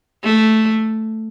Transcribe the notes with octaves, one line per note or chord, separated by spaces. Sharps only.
A3